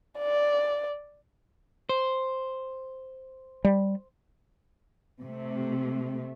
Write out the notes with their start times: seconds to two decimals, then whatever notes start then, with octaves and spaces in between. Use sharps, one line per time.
0.18 D5
1.89 C5
3.64 G3
5.21 C3 A3